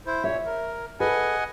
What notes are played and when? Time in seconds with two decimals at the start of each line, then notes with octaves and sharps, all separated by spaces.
0.06 E4 C5
0.24 A#2 C#5 E5
0.46 A#4
1.00 A4 B4 D#5 F#5 G#5